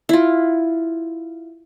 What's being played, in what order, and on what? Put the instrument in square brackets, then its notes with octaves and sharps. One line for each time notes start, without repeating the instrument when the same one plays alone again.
[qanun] E4 F4